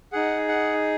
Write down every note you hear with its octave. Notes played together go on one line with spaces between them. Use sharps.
D#4 G#4 F#5
F#5